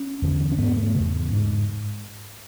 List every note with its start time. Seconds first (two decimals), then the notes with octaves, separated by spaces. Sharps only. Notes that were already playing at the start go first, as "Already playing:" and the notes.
Already playing: C#4
0.22 E2 D3
0.52 C#4
0.58 G#2 B3
0.77 A3
0.95 C#3
1.00 E2
1.32 G#2